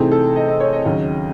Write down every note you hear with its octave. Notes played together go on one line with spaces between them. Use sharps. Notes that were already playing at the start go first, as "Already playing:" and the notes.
Already playing: C3 E3 A3 C4 D#4 G#4
A4
D#5
D#5
C#5
D#5
D#2 C#3 F#3